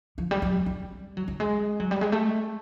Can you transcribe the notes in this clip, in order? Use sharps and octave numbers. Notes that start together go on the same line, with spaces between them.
F3
G3
F#3
G3
F#3
G3
G#3
F#3
G3
G#3
A3